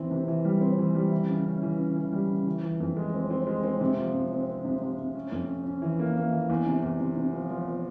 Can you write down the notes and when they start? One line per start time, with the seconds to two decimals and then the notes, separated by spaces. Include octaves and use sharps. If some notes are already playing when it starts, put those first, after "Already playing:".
Already playing: E3 C4
0.11 C3
0.28 E3
0.45 G3
0.61 C4
0.78 E3
0.95 G3
1.12 E3
1.29 C#3
1.45 C#4
1.62 E3
1.79 C#4
1.96 E3
2.12 G3
2.30 C#3
2.46 E3
2.63 E3
2.80 F2
2.97 G#3
3.13 C4
3.30 C4
3.47 G#3
3.64 C4
3.81 C3
3.98 F3
4.14 C3
4.32 C4
4.48 C4
4.65 C3
4.82 C3
4.98 C3
5.15 C#4
5.32 F2
5.48 C#4
5.66 C#4
5.82 E3
5.99 A#3
6.16 A#3
6.32 E3
6.49 E2
6.66 C3
6.83 E2
7.00 C3
7.17 C3
7.33 F3
7.50 F3
7.67 F3